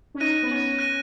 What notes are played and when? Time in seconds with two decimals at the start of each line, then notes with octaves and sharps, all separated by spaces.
0.14 C#4
0.20 D#4 F#6 A#6 D#7
0.42 B3
0.50 C#4
0.79 F#6 A#6 D#7